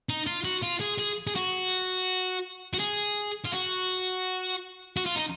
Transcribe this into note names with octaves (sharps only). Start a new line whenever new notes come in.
D#4
F4
F#4
F4
G#4
G#4
G#4
F#4
F#4
G#4
F4
F#4
F#4
F4
D#4